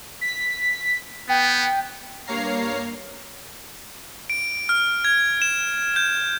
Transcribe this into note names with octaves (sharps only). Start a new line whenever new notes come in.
B6
B3 G5
G2 A#3 C#5 F5 A#5 C7
D7
F6
G#6
E7
G6